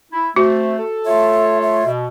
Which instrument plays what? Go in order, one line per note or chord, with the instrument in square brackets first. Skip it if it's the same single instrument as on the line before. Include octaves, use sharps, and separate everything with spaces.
[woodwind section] E4
[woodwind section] A3 [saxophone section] C4 C5 [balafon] F#4
[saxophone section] A4
[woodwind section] A3 F4 C#5 [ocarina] E5
[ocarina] E5
[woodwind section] B2